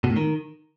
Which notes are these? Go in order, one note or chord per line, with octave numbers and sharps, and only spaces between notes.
B2
A2
D#3